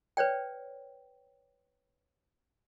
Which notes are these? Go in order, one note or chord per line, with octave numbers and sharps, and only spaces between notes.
B4 C#5 D5 G5